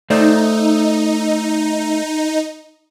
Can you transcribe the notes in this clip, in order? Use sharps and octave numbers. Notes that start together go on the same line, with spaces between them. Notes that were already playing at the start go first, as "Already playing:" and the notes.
A3 D#4 C5 D5